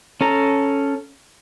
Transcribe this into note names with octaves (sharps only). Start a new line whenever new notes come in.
C#4 A4 A#5